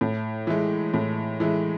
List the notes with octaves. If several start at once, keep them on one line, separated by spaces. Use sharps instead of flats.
A2
E3 G#3
A2
E3 G#3